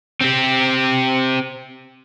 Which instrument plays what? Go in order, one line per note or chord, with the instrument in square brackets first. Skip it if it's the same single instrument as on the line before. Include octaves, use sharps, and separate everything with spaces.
[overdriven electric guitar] C4 G4